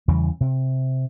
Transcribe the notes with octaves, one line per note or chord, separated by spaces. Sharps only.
E2 C#3 E3 G3
C3